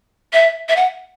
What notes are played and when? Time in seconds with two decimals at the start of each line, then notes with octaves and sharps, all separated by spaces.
0.33 E5
0.69 E5
0.76 F#5